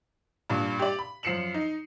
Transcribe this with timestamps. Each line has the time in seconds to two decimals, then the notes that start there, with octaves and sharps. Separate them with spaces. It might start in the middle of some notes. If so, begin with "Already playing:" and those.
0.50 G2 A#2 D4
0.79 G4 D5
0.99 B5
1.23 F#2 F3 C7 C#7 E7 F#7
1.54 D#4